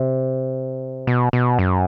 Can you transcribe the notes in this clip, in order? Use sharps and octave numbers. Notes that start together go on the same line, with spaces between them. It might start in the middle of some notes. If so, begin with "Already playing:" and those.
Already playing: C3
B2
B2
F#2